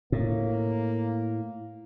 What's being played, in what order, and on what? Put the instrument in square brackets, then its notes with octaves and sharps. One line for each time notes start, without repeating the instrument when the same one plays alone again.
[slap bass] A2 [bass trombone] A#3